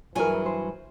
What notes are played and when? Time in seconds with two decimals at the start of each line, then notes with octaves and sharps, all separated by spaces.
0.15 G2 E3 F#3 G#4 A#4 G#5
0.46 C5